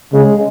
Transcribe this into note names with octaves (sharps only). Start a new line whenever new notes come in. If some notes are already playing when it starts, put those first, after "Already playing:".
C#3 G#3